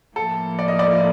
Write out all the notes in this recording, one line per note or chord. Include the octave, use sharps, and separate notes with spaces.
A2 F3 A#3 A4
D5
D#5
D5